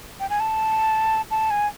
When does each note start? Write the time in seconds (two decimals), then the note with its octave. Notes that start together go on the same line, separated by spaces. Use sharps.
0.20 G5
0.30 G#5
0.40 A5
1.31 A5
1.51 G#5